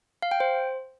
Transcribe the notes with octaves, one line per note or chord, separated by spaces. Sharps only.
F5
G5
C5